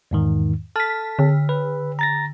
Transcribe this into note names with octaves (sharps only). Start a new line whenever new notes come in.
E2 G#2 D#3
A4 A5 F6 B6
D3
B4
A#5 A6 A#6